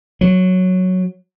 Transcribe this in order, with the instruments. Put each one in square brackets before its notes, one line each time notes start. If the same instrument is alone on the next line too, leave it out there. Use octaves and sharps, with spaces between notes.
[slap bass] F#3